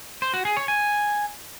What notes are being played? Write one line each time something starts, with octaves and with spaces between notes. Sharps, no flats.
C5
F#4
G#4
C#5
G#5